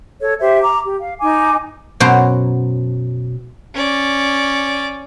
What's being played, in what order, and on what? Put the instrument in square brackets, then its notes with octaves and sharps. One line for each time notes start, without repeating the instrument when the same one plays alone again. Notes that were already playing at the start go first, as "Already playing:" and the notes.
[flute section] A4 C#5
G4 C5 E5
A#5 D6
G4
F5
D#4 G#5 D6
[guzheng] F#2 B2 F#3 C5 A#5
[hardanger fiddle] C#4 D5